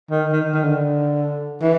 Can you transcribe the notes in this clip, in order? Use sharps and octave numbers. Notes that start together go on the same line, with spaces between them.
D#3
D#3
D#3
D3
E3